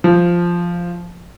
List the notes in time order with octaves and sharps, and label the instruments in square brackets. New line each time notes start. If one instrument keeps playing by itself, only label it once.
[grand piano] F3